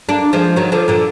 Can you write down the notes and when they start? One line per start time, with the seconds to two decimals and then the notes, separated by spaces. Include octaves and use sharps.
0.09 A#3 D4
0.33 F3 G#3
0.56 D#3 F#3
0.72 D3 F3
0.88 A#2 D3